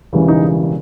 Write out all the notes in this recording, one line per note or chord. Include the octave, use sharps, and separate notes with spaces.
E1 E2 C#3 E3 G3
D#4